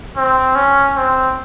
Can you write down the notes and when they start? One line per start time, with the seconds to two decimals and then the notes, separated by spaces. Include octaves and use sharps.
0.17 C4
0.55 C#4
0.96 C4